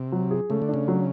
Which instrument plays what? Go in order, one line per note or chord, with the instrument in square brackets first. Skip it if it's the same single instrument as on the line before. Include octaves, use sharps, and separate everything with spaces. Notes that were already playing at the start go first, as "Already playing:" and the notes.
Already playing: [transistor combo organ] C3
[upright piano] F#3
G#4
[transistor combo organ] C#3 [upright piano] A3
[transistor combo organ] D3
[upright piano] D4
[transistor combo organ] C#3
[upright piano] F#3